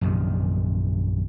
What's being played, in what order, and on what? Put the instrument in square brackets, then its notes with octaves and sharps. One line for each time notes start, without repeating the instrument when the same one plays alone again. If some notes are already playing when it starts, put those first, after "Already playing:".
[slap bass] A#1 F#2 C3 D#3